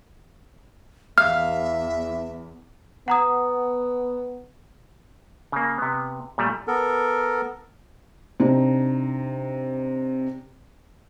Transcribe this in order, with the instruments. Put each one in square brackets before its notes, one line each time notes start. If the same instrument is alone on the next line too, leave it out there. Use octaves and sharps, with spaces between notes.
[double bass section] E2 [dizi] E5 [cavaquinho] F5 [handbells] F6
[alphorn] B3 [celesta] F#5 A#5 D#6
[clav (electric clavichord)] C#3 A#3
C3 B3
A#2 G3 A3
[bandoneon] B3 A4 A#4
[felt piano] C3 D4 D#4